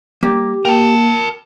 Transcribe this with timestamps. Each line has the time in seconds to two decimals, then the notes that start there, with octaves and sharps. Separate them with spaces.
0.23 G3 A#3 G4
0.65 A#3 A#4 G5 A5